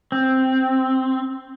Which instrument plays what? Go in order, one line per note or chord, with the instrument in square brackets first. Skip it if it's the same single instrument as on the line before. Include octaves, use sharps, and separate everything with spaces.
[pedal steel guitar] C4